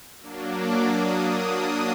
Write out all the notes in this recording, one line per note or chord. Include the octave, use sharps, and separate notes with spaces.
F#3 A#3 D4
D6
D#6
D#6